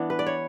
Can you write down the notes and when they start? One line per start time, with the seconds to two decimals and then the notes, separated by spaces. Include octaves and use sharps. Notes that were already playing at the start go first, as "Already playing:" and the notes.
Already playing: E3 B3 D4
0.10 B4
0.19 D5
0.27 C#5